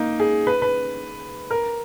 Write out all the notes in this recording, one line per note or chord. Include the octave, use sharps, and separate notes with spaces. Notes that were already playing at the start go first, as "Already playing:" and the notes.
Already playing: A#3 D#4
G#4
B4
B4
A#4